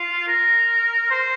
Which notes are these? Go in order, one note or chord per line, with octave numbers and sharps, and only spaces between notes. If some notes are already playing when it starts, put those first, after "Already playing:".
Already playing: F4
A#4
C5